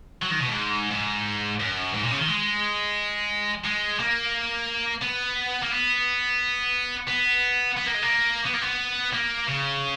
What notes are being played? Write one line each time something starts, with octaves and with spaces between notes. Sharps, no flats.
F#3
D#3
B2
G#2
G#2
F#2
G#2
A#2
C#3
D#3
G#3
G#3
A#3
B3
A#3
B3
B3
B3
A#3
G#3
A#3
B3
A#3
B3
A#3
C#3